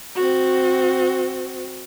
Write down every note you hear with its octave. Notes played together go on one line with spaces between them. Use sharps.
C4 F#4